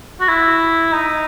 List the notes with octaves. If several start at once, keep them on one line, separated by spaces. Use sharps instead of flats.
F#4
E4
D#4